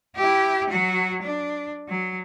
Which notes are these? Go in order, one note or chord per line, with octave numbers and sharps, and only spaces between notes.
E4 G4
F#3 F#4
D4
F#3